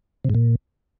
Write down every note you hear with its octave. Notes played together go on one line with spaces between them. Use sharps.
C3
G#2
A#2